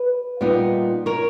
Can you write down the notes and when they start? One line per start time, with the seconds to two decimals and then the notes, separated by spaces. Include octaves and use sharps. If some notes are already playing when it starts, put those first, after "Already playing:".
Already playing: B4
0.41 A#2 G3 B3 D#4
1.06 A#4 C#5